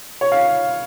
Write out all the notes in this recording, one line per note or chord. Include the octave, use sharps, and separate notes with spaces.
C#5
F5